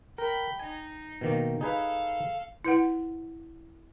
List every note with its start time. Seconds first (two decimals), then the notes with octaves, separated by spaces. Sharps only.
0.18 A#4 G5 B5
0.60 D#4 G#5
1.21 B2 D#3 A#3
1.61 D#4 G#4 A4 B4 F5
2.64 E4 B4 F#5